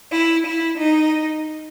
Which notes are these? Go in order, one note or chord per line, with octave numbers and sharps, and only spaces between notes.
E4
E4
D#4